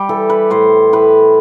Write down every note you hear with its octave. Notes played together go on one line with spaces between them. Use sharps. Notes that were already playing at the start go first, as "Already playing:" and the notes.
Already playing: G3 G4
E3 A4
B4
A2 C5
A2 B4